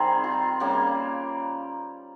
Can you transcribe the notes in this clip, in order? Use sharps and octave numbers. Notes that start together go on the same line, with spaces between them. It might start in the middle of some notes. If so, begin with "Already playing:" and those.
Already playing: C3 D#3 G3 C4 G#4
F4
C#3 G3 A#3